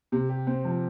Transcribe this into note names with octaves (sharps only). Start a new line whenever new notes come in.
C3
G4
C4
F3